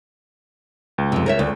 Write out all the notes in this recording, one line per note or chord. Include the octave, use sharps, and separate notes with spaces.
C#2
F2 C3
A#4 C#5 E5
D2